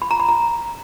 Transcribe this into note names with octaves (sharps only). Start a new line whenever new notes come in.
B5
A#5
B5
A#5